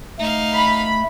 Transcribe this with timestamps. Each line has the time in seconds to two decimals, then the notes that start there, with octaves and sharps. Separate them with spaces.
0.19 A3 D#4 F5
0.53 B5